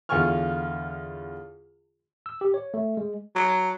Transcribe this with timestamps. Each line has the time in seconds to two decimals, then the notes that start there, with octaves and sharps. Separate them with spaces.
0.09 E2 D3 F4 G#5 C#6 F6
2.26 E6
2.41 G4
2.54 C#5
2.74 A3
2.97 G#3
3.35 F#3